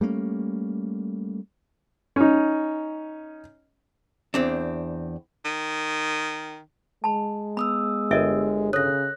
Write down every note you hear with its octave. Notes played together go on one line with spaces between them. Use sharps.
G3 A3 A#3 C#4
C#4 D#4
E2 C4 D4
D#3
G#3 A5 B5
B3 B5 D#6 E6
G1 A#4 D#5 E5 G5
C#3 A4 C#5 F#6 A#6